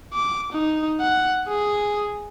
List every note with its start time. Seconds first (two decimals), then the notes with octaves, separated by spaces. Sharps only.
0.13 D6
0.52 D#4
1.01 F#5
1.48 G#4